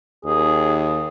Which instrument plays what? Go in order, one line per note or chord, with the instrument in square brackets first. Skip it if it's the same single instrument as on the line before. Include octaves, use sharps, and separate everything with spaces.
[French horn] D#2 [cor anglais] G#4